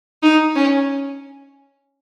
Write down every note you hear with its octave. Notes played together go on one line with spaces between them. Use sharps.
D#4
C#4